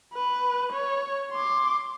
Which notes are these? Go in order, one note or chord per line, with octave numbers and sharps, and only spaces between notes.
B4
C#5
C6 D6